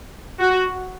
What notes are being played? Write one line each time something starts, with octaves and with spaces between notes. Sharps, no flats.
F#4